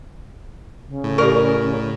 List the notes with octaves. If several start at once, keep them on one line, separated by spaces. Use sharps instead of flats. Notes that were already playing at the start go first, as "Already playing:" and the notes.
C#3
A2
G4 A#4 D5 C#6